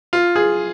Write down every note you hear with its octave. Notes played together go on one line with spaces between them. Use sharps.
F4
G#4